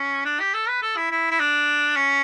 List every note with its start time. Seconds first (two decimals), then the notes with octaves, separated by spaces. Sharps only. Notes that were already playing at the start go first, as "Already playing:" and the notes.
Already playing: C#4
0.25 D4
0.40 G4
0.54 A4
0.68 B4
0.82 A4
0.96 E4
1.11 E4
1.31 E4
1.40 D4
1.96 C#4